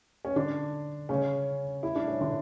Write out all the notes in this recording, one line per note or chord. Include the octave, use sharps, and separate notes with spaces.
C#4
D3 D4
C#3 C#4
E4
D4
C#4
D3 D4